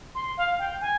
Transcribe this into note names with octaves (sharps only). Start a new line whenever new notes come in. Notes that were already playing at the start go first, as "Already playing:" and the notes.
C6
F5
G5
G#5